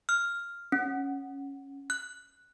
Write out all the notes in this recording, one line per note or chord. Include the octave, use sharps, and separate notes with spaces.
F6
C#4
F#6